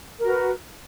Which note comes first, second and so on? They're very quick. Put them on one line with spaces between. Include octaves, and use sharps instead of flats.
A#4 F#4 B4